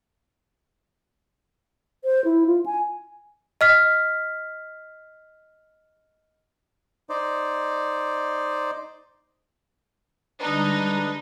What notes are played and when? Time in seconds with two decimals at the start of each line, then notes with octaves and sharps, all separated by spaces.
2.04 C5
2.25 E4
2.47 F4
2.66 G#5
3.61 D#5 F6 B6
7.09 D#4 C5 D5
10.40 D3 G3 G#3 D4 D#4 B4